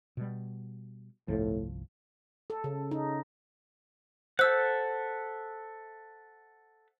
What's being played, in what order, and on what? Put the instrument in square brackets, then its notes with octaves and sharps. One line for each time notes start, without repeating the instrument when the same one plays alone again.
[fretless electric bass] B2 G3
[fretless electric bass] G1 C2 F3 [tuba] A2
[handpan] A4
C#3
D#4
[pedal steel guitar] A4 E5 F#5 [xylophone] C5 E6